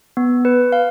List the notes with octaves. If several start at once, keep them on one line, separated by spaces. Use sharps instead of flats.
B3
B4
F5